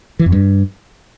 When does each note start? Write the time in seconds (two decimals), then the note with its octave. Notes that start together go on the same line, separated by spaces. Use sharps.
0.19 E3
0.26 F2
0.32 G2